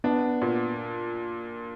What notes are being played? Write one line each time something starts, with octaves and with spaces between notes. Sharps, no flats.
B3 D4
A#2